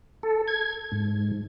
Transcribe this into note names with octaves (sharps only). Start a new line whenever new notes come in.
A4
G#6
G#2